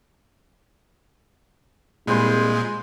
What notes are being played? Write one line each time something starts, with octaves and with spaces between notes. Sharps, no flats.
C2 A#2 G#3 G#4 B4 C5 C6